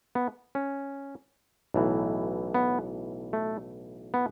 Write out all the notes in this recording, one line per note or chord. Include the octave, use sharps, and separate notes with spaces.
B3
C#4
B1 A2 E3
B3
A3
B3